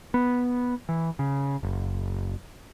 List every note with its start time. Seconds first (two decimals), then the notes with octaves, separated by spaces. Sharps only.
0.14 B3
0.89 E3
1.19 C#3
1.63 F#1